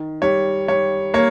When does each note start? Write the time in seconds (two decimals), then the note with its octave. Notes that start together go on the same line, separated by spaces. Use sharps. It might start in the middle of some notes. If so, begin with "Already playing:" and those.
Already playing: D#3
0.22 G3 C#5
0.68 G3 C#5
1.14 A#3 C#5